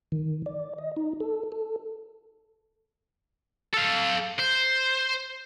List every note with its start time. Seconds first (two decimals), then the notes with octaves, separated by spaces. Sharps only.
0.12 D#3
0.46 D5
0.78 D#5
0.97 D#4
1.20 A4
1.52 A4
3.73 A4 F5
4.39 C5